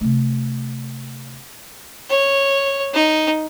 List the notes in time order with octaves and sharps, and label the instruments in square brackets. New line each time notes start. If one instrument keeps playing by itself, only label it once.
[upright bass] C3 A3
[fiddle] C#5
D#4